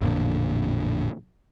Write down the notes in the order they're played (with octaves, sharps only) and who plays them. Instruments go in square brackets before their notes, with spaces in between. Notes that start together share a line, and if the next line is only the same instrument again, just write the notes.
[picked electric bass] A1 F2 A#2 D3